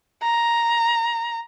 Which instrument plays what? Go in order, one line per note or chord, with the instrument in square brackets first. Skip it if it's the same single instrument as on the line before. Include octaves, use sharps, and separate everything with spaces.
[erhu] A#5